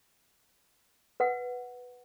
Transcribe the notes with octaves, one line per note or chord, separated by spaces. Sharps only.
B4 F#5